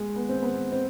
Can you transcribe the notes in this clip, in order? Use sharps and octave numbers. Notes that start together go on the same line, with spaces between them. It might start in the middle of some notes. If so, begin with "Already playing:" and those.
Already playing: G#3
B3
C4
B3
C4